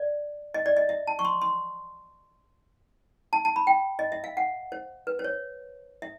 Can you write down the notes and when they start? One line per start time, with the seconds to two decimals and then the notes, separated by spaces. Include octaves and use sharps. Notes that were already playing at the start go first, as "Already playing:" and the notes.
Already playing: D5
0.54 D#5
0.66 D5
0.77 D#5
0.89 E5
1.07 A5
1.19 C#6
1.25 C6
1.42 C6
3.33 A5
3.45 A5
3.56 B5
3.67 G5
3.99 D#5
4.12 E5
4.24 F5
4.37 F#5
4.72 C5
5.07 B4
5.19 C5
5.24 C#5
6.02 E5